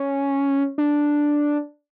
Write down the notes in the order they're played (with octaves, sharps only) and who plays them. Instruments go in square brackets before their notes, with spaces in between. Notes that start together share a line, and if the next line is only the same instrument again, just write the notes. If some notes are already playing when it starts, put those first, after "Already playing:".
Already playing: [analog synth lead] C#4
D4